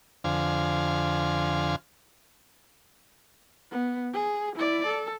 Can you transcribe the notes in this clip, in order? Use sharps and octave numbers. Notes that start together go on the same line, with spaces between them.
F2 D3 C5 F5 G#5
B3
G#4
E4 D5
A4